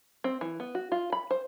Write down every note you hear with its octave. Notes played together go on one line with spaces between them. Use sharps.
C4
E3
B3
F#4
F4
B5
C5